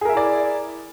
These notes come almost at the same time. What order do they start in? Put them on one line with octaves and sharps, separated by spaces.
G#4 A#4 E5 E4 D5